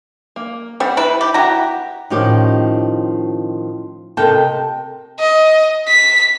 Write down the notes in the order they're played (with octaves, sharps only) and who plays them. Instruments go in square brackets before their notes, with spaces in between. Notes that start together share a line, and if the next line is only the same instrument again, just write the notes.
[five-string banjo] A#3
[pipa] G3 [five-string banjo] C4 C5 F#5
[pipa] E4 B4
G4
[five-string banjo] E4 G4 [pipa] F#4 A#5
[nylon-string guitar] A2 D#3 F3 C#4 D#4 G4
C3 A4 A#4 D#5 G5 A5
[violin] D#5
B6